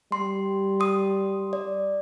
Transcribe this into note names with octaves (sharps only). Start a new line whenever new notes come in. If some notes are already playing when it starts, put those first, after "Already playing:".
G3 C6
C6 D#6
D5